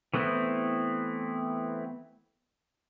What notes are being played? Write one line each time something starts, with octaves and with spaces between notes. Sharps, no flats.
E3 A3 B3 C4 E4